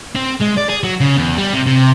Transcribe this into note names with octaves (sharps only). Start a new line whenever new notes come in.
C4
G#3
D5
G#4
F#3
C#3
E2
G3
C3
C3